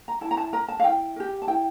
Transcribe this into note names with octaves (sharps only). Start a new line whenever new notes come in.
A#5
E4 A5
A#5
A5
A#4 A#5
A5
F5
E4 G5
G4 A#4
A5
E4 G5